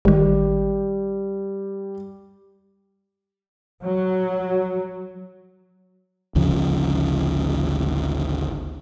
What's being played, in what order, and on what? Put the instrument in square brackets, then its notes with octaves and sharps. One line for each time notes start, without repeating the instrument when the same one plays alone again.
[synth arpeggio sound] G#1 D#3 [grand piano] G3 G4
[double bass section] F#3
[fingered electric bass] G#1 D2 C#3 F3